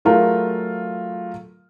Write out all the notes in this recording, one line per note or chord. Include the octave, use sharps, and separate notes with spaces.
F#3 A3 F4 G#4 A#4